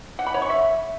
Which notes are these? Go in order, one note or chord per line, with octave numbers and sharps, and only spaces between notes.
F#5
B5
C#5
C#6
E5